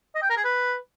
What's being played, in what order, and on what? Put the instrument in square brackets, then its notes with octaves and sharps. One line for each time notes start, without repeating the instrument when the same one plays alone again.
[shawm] D#5
G5
A#4
G#4
B4